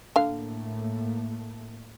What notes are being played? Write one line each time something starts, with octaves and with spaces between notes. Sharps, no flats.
A2 D3 A3 A#3 F5